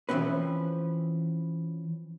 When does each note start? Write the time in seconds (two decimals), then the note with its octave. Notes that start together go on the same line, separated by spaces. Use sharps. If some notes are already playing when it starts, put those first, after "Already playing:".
0.09 E3 F3 G3 C4 C#4 B4